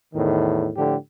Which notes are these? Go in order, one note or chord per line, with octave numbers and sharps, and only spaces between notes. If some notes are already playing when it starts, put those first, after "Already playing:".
E2 A2 D#3
A2 D3 F3 G4